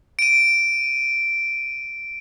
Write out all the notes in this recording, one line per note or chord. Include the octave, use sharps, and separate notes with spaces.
D7 D#7